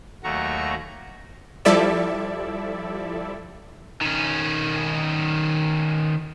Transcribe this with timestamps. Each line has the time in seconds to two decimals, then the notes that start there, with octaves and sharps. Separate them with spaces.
0.24 D#2 F#3 A3 F#4 A#5 C#6
1.65 F3 G3 E4 A4 D5 E5
4.01 D#3 C#4